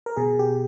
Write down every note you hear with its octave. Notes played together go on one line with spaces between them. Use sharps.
A#4
B2 G#4
G4